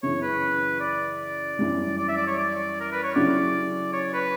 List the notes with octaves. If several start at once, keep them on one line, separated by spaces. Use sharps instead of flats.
F#2 C#3 E3 C#5
B4
D5
F#2 E3 G3
D5
E5
D5
C#5
D5
A#4
B4
C#5
C#3 F#3 C#4 E4 G4 D5
C#5
B4